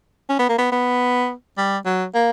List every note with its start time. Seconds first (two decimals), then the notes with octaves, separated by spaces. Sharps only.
0.29 C#4
0.39 B3
0.49 A#3
0.58 B3
0.72 B3
1.58 G3
1.86 F#3
2.14 A#3